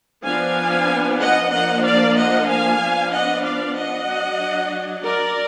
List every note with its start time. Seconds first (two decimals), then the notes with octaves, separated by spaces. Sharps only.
0.25 F3 B3 D4 F5 G#5
1.20 D#5 F#5
1.52 F3 A#3 D4 D#5 F#5
1.84 D5 F5
2.16 D#5 F#5
2.49 F5 G#5
2.80 F3 B3 D4
3.13 D#5 F#5
3.45 D5 F5
3.76 D#5 F#5
4.08 F#3 D4
5.04 A#4 D5